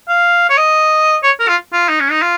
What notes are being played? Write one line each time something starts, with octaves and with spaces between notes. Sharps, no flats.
F5
C#5
D#5
C#5
A#4
F4
F4
D#4
C#4
D#4
F4